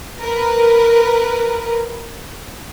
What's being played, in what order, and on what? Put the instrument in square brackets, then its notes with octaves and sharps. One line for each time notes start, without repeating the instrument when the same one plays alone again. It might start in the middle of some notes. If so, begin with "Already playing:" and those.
[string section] A#4 B4